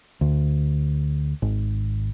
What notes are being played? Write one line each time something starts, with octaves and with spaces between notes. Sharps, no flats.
D2
G#1